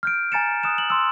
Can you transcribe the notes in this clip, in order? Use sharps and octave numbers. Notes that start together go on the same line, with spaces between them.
F6 G6 D7
G#5 A#5 A6 C#7 E7
D#6 F#6 E7
F#7
C6 E6